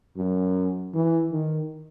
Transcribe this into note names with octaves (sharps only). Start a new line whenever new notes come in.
F#2
E3
D#3